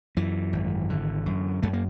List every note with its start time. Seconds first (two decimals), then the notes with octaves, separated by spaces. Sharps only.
0.17 F#2 E3
0.53 G#1
0.90 D3
1.26 F#2
1.62 F#2 A3
1.73 A#3